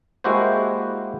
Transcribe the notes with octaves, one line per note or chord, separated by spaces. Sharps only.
G#3 A#3 E4 F#4 G4 C5